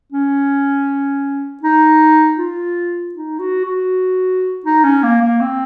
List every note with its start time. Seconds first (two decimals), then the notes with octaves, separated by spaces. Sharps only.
0.12 C#4
1.63 D#4
2.38 F4
3.15 D#4
3.39 F#4
3.65 F#4
4.66 D#4
4.84 C#4
5.03 A#3
5.22 A#3
5.41 C4